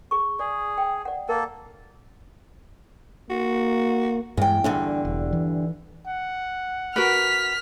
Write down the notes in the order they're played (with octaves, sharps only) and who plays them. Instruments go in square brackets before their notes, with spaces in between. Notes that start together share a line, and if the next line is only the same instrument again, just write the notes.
[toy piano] G#4 C#6
[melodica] G#4 [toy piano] D5
[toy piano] G5
D5 F#5
[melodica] A#3 A4 [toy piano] A#4
[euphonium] A#3 [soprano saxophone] F#4
[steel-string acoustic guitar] E2 G5 [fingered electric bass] G2 G#3
[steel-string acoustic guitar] E2 G2 D3 [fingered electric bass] D4
[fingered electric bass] E1
E3
[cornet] F#5
[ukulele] F#4 A#4 B4 [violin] F6 B6